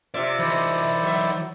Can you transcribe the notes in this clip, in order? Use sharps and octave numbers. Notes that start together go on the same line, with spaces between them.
C3 F4 D5 E5
E3 D#4 E4 C5 D5
F#3 E5